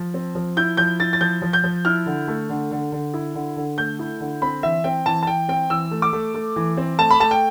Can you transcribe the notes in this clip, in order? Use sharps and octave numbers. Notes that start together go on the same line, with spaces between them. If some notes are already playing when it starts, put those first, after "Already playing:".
Already playing: F3
C4
F3
E4 G6
F3 G6
E4 A6
A6
F3 G6
F3
G6
F3
E4 F6
D3
A3
D3
D3
D3
E4
D3
D3
A3 G6
E4
D3
C4 B5
E3 E5
C4 G5
E3 A5
A5
E3 G5
C4 G5
E3 E6
A3
D6
A3
A3
E3
C4
A3 A5
B5
A3 A5
G5